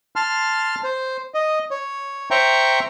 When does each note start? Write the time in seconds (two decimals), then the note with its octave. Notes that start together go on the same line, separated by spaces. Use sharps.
0.16 A5 C6 F6
0.84 C5
1.34 D#5
1.71 C#5
2.31 C5 E5 G5 A#5 C#6